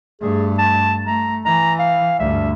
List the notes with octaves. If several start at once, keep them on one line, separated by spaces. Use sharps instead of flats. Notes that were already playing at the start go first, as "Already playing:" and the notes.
G2 A3 G#4
A5
A3 A#5
E3 A#5
F5
D2 G2 E5